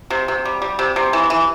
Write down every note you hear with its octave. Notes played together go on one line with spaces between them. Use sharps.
C3
C3
G3
G3
C3
C3
E3
E3